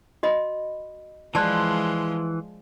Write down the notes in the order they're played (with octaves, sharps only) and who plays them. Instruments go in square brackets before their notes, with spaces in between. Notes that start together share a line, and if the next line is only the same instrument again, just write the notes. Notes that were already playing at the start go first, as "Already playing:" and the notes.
[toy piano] F#4 D#5 B5
[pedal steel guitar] E3 C6 F#6 [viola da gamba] F3 G#3 [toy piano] D5 A5